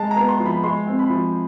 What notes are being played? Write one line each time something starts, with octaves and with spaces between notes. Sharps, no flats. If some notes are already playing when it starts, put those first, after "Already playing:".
Already playing: G#3 A5
A#5
B3
C6
F3
B5
G#3 C6
C4
B5
F3